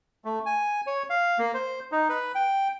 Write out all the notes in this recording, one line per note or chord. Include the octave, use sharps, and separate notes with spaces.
A3
G#5
C#5
F5
A#3
C5
D#4
B4
G5